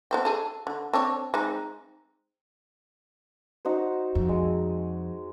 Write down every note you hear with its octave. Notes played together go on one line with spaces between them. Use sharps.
B3 C4 G5
G#4 A4
D3
C4 D4 C#5
G#3 C4 D#4
D#4 F#4 C5
F2
G#3